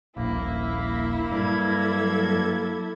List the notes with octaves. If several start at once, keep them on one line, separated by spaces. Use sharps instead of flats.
D#1 A#1 A#3 E4
G2 F#3 A4 G#6